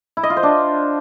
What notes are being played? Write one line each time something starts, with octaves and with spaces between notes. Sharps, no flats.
E4
D#5
F4
C5
D4